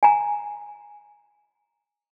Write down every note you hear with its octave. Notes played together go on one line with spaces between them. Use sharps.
G#5 A#5